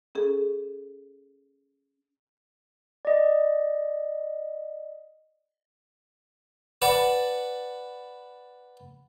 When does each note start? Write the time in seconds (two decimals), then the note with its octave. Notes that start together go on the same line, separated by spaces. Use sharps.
0.15 C#4 G#4 A4
3.05 D5 D#5
6.82 B4 D5 F#5 A5